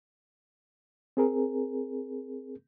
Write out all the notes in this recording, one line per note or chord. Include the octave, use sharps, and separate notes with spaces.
C4 G#4 A#4